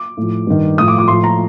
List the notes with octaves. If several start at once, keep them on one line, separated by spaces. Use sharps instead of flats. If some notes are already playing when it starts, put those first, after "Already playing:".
Already playing: D6
A2 F3
G2 D#3
A2 F3 D#6
D6
D6
A2 F3 C6
A#5